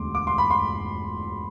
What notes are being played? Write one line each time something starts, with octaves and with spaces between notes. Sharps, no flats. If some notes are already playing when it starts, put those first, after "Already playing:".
Already playing: E1 D2 D3 A3 C6 D6
D6
C6
B5
C6